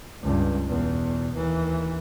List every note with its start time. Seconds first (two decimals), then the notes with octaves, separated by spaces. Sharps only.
0.22 C#2 G2
0.68 E2 B2
1.35 D#2 E3